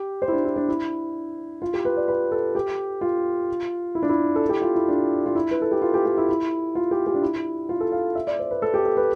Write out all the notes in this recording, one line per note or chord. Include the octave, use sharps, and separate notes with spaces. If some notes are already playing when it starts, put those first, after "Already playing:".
Already playing: G4
C5
E4
D4
E4
D4
E4
F4
G4
B4
D5
B4
A4
G4
F4
E4
D4
E4
A4
G4
F4
E4
D4
F4
E4
B4
A4
G4
F4
G4
G4
E4
E4
F4
G4
G4
D4
E4
F4
A4
F5
E5
D5
C5
B4
A4
G4
A4
B4